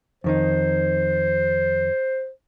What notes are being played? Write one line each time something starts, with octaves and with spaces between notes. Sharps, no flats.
F2 D#3 D#4 C5